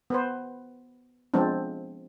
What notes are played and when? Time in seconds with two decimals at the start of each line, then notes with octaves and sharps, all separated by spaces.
0.10 B3 B4 C5
1.34 F3 G#3 B3 C4 D4